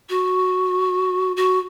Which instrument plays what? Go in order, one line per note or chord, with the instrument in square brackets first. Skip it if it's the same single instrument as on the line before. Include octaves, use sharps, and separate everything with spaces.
[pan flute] F#4
F#4